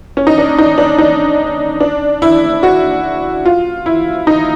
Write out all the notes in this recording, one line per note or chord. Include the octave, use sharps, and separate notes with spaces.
C#4
D#4
D4
D#4
D4
D#4
D4
E4
F#4
F4
E4
D#4